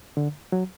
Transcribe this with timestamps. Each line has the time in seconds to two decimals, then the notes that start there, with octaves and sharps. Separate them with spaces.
0.17 D3
0.52 F#3